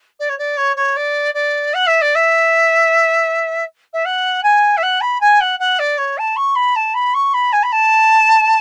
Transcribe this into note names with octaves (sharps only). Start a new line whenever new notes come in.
D5
C#5
D5
C#5
C#5
D5
D5
F#5
E5
D5
E5
E5
F#5
G#5
E5
F#5
B5
G#5
F#5
F#5
D5
C#5
A5
C#6
B5
A5
B5
C#6
B5
G#5
B5
A5